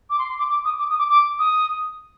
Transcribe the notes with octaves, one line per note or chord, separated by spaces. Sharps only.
D6
C6
C6
D6
D6
D#6
D6
D#6
D6
D6
D#6